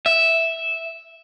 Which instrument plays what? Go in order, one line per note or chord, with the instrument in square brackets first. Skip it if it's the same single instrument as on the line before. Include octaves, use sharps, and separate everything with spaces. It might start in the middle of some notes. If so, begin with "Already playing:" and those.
[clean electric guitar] E5